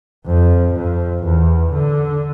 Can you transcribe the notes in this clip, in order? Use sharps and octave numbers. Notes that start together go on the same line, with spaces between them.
F2
F2
E2
D3